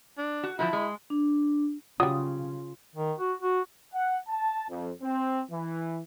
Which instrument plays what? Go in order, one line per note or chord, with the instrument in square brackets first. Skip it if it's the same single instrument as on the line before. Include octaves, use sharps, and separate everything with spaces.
[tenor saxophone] D4
[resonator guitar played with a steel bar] F#4
[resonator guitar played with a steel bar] F3 G#3 F#4 [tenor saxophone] E4
[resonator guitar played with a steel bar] G#3
[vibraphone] D4
[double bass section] C#3 [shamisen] F#3 G3 [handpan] F4 [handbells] D#6
[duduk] D#3
F#4
F#4
[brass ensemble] F#5
A5
F2
C4
E3